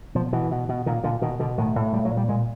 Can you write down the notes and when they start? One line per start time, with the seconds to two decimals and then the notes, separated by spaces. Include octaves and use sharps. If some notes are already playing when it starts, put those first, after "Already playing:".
0.15 B2 F3
0.33 B2 E3
0.51 B2
0.69 B2
0.86 A#2 D#3
1.03 A#2 D3
1.22 B2 D#3
1.39 B2 D3
1.58 A2 D#3
1.76 A2
1.93 A#2 G3
2.05 F#3
2.11 A#2
2.17 G3
2.29 A#2 G#3